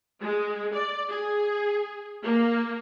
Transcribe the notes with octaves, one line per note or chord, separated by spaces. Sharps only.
G#3
D5
G#4
A#3